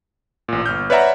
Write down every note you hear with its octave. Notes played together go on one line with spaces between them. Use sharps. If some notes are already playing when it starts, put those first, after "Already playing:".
A1 A#2
G1 F6 G6
B4 C#5 D5 E5 F#5 A#5